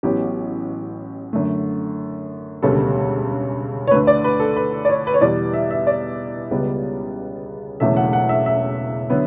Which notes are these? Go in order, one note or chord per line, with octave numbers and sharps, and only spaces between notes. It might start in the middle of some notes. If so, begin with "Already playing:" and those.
A1 A2 F#3 B3 G4
F#2 D3 A3
E1 D2 C#3 G3 B3 A4
C#5
D2 D3 A3 B4
D5
B4
A4
B4
D5
C#5
B4
C#5
E2 B2 G3 D5
E5
E5
D5
C#2 C#3 G3 B3
E1 E2 C#3 F#3 A3 E5
F#5
F#5
E5
E5
D3 F#3 B3